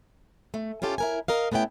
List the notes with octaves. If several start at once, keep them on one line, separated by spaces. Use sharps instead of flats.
A3
C#4 E4 F4 G4 A4
E4 A#4 G#5
A#4 D#5 F5
A3 B3 C#4 E4 G5